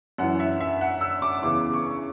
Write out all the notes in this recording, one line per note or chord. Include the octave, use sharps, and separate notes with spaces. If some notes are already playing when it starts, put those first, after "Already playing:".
F#2 E3 F#5
E5
E5
F#5
E6
D6
E2 C#3 E3 D6
C#6